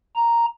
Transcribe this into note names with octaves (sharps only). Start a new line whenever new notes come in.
A#5